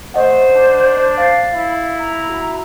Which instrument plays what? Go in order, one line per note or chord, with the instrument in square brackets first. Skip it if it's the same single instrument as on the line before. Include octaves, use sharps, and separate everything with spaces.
[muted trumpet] A3 [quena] C5 [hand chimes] D#5 F#5
[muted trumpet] D4
[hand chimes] F5 A6 C7
[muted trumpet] E4
[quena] A#5
[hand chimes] F#4